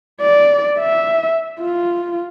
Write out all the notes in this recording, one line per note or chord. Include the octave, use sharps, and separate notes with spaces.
D5
E5
F4